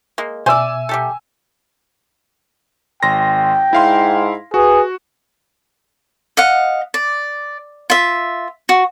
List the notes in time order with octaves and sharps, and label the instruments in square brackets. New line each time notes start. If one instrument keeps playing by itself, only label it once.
[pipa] G#3 A#3
[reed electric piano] B2 E5 [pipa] C5 D5 [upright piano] G#5 E6
[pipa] G3 G4 A4
[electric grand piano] G#1 C6 A#6 [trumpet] G5
[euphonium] G#2 [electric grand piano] E4 F5 C6
[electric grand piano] F#4 [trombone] G#4 [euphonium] B4
[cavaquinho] D#5 F5 F#5
D5
F4 E5
F#4